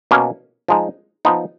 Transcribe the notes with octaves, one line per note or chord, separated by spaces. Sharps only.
B2 A#3 C#4
F3 G#3 D#4
F3 B3 D#4